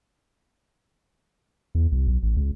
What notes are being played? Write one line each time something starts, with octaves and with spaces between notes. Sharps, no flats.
E2
C2
B1
A1
C#2